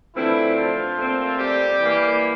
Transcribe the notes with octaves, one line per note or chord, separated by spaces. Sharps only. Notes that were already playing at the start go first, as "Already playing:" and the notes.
D3 E3 F3 A3 C4 E4
F3 F4
A#2 A3 C4
G3 G4
E3 A#3